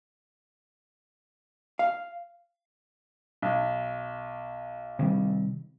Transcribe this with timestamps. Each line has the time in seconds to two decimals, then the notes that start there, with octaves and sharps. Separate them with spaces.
1.79 F5
3.42 B1
4.99 C3 D#3 G3